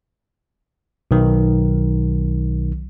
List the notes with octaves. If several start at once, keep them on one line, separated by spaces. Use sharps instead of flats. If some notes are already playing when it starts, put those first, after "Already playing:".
B1 D#3